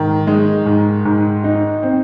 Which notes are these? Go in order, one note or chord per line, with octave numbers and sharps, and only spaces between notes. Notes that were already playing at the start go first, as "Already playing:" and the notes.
Already playing: G#2 D#3
G#3 D#4
G#2
G#2
D#4
C4